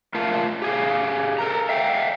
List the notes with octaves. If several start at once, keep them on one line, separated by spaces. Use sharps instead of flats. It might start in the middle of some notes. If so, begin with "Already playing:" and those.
A3 F4 A#4 F5 A5
G4 G#4 F5
A4 A#4 A#5
E5 F5 G5